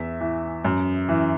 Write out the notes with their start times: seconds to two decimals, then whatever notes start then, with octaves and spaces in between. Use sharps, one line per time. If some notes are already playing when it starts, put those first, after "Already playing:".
Already playing: E2 E5
0.21 E3
0.65 F#2
1.09 E3